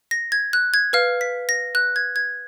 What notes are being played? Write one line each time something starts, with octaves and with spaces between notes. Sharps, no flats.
A#6
G#6
F#6
G#6
B4 F5 F6
B6
A#6
F#6
G#6
G#6